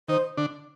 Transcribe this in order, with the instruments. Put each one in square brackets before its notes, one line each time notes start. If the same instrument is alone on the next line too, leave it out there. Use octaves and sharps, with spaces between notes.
[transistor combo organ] D#3 D#4 [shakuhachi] C5
[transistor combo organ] D3 D4